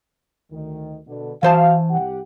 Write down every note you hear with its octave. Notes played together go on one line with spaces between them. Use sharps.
D2 D#3
B2 D3
E3 F#4 C5 F5 A5
C2 G4 F#5